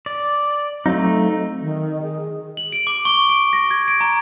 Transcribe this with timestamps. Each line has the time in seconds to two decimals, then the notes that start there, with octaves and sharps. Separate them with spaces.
0.06 D5
0.86 F#3 A3 C4 D#4 F5
1.61 D#3
2.02 G#4
2.57 F#7
2.72 D7
2.87 D6
3.05 C#6
3.29 D7
3.53 A#6
3.71 G#6
3.88 D7
4.01 A#5